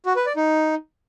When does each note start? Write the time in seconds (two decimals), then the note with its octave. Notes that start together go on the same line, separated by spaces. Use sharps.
0.06 F#4
0.16 B4
0.26 D5
0.36 D#4